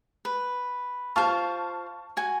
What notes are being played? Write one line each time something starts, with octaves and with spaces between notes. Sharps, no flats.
B4
F4 C5 A5 C#6 F6
F#4 G#5